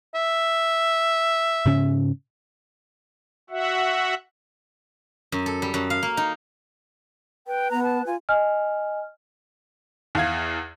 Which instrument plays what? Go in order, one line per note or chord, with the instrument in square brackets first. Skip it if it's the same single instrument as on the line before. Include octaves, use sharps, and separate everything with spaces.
[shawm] E5
[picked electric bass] G#2 C#3 C#4
[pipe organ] F#4 E5 F#5
[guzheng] F#2
A4
G3
F#2
F5
A#3
D#4
[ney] B4 [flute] G5
[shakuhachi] B3 [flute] A#5
[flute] A5
[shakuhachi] F4 [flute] G#5
[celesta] D#5 G#5 F6
[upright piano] E2 F5 G#6